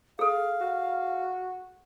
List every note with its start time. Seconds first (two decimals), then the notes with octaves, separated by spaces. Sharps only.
0.19 G#4 A4 F5
0.61 F#4